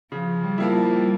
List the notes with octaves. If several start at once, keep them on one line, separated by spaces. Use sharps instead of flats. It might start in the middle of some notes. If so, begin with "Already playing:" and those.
C#3 F3
G3
F3 A#3 E4
G3